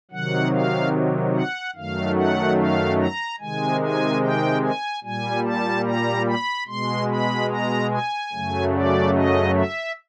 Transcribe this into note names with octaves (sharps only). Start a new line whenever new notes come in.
C3 D#3 F#3 F#5
F5
F#5
F#2 D#3 F#3 A3 F5
F#5
F5
A#5
C3 D#3 G#3 G#5
G#5
G5
G#5
A#2 G3 G#5
A5
A#5
B5
B2 G#3 C6
B5
A#5
G#5
F#2 C#3 F#3 A3
D5
D#5
E5